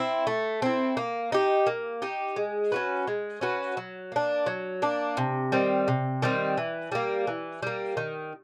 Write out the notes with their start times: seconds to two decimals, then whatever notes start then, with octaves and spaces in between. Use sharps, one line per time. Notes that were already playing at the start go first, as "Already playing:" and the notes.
Already playing: C4 E4
0.27 A3
0.62 C4 E4
0.97 A#3
1.32 D#4 G4
1.67 A#3
2.02 D#4 G4
2.36 G#3
2.72 C#4 F#4 B4
3.07 G#3
3.41 C#4 F#4 B4
3.77 F#3
4.12 A#3 D4
4.46 F#3
4.82 A#3 D4
5.17 C3
5.52 D#3 G3 C4
5.88 C3
6.22 D#3 G3 C4
6.57 E3
6.92 G3 A#3
7.27 E3
7.63 G3 A#3
7.97 D#3